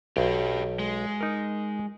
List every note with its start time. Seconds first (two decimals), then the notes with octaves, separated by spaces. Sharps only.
0.17 B1 G4 B4
0.79 G#3
1.21 D#4 A#4